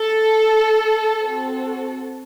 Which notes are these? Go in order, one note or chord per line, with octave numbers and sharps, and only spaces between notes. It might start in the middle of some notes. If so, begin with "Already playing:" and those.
Already playing: A4
C4 F#4 A4